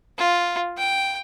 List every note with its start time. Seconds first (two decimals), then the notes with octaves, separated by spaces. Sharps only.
0.18 F4
0.77 G5